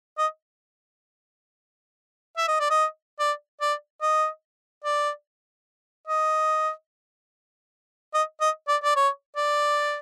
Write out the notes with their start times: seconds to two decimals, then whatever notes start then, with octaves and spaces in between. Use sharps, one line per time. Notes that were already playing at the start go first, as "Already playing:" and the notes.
0.18 D#5
2.37 E5
2.48 D#5
2.60 D5
2.70 D#5
3.19 D5
3.61 D5
4.02 D#5
4.85 D5
6.08 D#5
8.14 D#5
8.41 D#5
8.68 D5
8.84 D5
8.96 C#5
9.36 D5